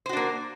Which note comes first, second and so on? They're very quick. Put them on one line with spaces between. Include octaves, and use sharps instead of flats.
C5 F#4 D4 A#3